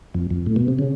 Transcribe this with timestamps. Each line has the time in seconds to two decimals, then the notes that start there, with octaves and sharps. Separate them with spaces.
0.14 F2
0.30 F2
0.46 A2
0.56 B2
0.68 C3
0.79 C#3